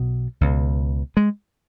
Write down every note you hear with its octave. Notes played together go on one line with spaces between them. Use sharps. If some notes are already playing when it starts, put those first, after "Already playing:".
Already playing: B1 B2
C#2 B2
G#3